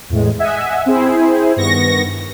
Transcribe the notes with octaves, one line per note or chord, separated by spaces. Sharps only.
E2 A2 G#3
D#5 E5 F#5 G#5
C4 E4 G#4 C5
G2 D#3 B3 C#6 A#6